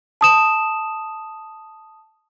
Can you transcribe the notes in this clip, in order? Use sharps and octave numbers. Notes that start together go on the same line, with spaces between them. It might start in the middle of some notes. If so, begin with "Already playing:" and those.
A5 D#6 E7